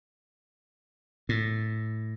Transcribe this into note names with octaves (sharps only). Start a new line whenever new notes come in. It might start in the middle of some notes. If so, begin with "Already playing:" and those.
A2